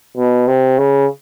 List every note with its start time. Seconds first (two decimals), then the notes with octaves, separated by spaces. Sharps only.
0.17 B2
0.48 C3
0.78 C#3